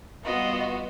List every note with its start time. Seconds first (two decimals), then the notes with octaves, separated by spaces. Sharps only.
0.24 G3 B3 F4 F#4 D#5